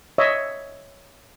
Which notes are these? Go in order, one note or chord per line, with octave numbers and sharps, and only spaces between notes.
C#5 D#5 E5